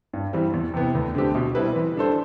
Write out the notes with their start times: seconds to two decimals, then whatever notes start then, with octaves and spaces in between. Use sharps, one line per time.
0.13 G2
0.33 E3 G3 C4
0.54 E2
0.74 C3 E3 B3
0.95 D2
1.15 D3 A3 C4 G4
1.35 B2
1.55 G3 C4 E4 B4
1.76 E3
1.96 G3 D4 A4 C5